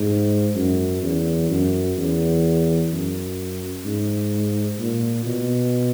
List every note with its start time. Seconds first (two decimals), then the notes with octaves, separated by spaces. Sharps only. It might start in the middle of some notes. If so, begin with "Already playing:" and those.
Already playing: G#2
0.55 F#2
1.02 E2
1.49 F#2
1.98 E2
2.91 F#2
3.85 G#2
4.79 A#2
5.26 B2